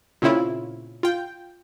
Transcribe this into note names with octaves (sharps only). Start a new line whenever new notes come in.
A#2 C#3 C4 C#4 E4 F4
F4 G5